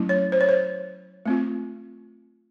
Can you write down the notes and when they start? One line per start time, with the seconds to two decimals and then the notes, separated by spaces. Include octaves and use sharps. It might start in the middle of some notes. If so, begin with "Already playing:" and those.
Already playing: F#3 A3 C#4 E4
0.09 C#5
0.32 C5
0.41 C#5
0.49 C5
1.26 A3 C4 F4